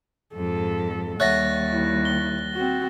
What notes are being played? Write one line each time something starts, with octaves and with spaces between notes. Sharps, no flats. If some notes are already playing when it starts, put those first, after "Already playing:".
F2 G#2 A4
D#2 G3 C#5 E5 F#5 F#6 A6 A#6
E4
G7
C4 F#4